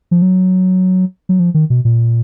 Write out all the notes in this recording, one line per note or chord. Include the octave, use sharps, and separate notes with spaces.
F3
F#3
F#3
F3
D#3
B2
A#2